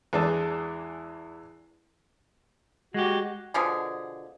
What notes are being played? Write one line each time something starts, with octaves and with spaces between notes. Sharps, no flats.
E2 E3 G#3 D4 G#4 A5
G#3 F#4 G4
B2 D3 F3 G#4